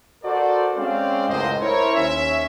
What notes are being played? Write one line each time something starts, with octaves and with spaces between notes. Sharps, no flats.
F#4 A4 A#4 C5 D5
G#3 C4 C#4 C5 D5 F5
C#2 F#2 A2 C5 D#5
E4 A#4 C5 C#5
D#2 C#4 C#5 E5